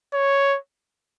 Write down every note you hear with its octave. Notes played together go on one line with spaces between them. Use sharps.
C#5